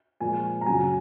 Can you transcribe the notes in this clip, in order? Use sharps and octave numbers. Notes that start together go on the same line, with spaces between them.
A#2 F3 G#3 G#5
A#5
F#2 C#3 F#3 G#5